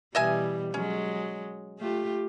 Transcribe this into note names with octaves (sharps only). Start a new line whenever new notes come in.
B2 E3 G3 D#5 E5 G#5
F#3 G#3 C#4
A3 F4 G4